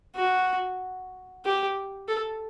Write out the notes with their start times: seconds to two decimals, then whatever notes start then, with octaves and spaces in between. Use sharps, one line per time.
0.16 F#4
1.45 G4
2.08 A4